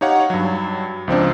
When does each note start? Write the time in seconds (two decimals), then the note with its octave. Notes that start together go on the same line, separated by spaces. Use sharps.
0.01 D#4 G4 C#5 F5 F#5
0.30 G2 F#3
1.08 C#2 F3 C4 D4